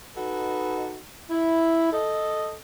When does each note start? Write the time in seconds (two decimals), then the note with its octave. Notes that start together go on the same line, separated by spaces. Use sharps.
0.17 D#4 F#4 A4 B4 D#5
1.31 E4
1.92 A4 D#5